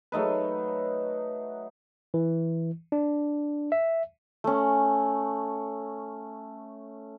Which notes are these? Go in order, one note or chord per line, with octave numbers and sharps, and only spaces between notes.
F#3 A3 D#4 B4
E3
D4
E5
A3 C#4